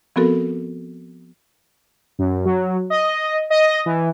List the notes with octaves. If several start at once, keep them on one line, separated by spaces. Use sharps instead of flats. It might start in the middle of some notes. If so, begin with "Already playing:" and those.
F3 B3 C4 F#4 A4 A#4
F#2
F#3
D#5
D#5
E3